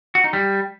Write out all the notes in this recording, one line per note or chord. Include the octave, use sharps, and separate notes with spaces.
F#4
D#4
G3